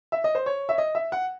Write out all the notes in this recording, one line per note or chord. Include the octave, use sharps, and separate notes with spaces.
E5
D#5
C5
C#5
E5
D#5
E5
F#5